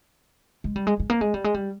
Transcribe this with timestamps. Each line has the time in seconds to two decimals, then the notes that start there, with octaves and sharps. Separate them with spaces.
0.64 G#3
0.76 G3
0.87 G#3
1.00 G#3
1.10 A#3
1.21 G#3
1.34 G3
1.44 G#3
1.54 G3